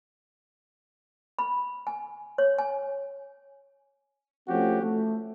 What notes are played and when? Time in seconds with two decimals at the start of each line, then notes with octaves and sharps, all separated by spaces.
1.39 B5
1.87 G#5
2.38 C#5
2.59 G#5
4.48 F3 A3 C4 C#4 F#4 G4
4.82 A3